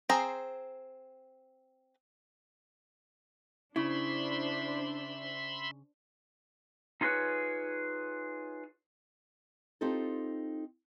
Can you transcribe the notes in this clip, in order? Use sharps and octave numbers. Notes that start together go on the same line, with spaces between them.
C4 G#4 C5 A#5
C#3 D4 E4 C5 E5 B5 C6
D#4 F4 G#4 A4 B4 C#5
C4 D#4 F4 G4 A4